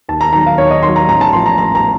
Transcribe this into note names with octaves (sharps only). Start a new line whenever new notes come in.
D#2 A5
A#5
D#3 F#3 A#5
F5
D#2 C#5
D#5
D#3 F#3 C6
A#5
A1 A#5
A5
A2 F3 C6
A#5
A1 A#5
A#5